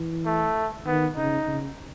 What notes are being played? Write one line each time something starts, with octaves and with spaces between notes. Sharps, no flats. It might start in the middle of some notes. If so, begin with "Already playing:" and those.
Already playing: E3
A3
D#3 B3
C#3 D#4
C#3